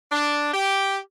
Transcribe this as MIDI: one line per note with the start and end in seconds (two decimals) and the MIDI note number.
0.12 0.53 62
0.54 0.99 67